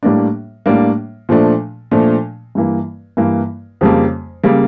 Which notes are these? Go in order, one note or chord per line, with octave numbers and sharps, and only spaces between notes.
A2 G3 A#3 D4
A2 G3 A#3 D4
A#2 F3 A3 D4
A#2 F3 A3 D4
G2 E3 A#3
G2 E3 A#3
F2 C#3 G3 A#3
C#3 G3 A#3